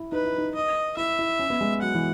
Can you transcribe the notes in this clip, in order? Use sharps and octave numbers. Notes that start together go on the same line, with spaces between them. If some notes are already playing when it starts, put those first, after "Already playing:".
Already playing: E4
D#4 B4
E4
D#4
D#5
E4 E5
E4
C#4
B3
G#3
F#3 F#5
E3